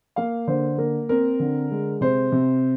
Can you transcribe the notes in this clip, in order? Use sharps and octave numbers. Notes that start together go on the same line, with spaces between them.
A#3 F5
D3 C5
A#3 A#4
C4 A#4
D3
G#3
C3 C5
C3